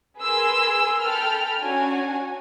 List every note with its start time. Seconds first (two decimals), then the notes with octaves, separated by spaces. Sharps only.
0.20 G#4 A#4 B4 G#5 C6 E6
1.04 A4 G5 B5 F6
1.62 C#4 D4 F#4 G#5